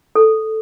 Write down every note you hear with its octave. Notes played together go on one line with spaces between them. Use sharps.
A4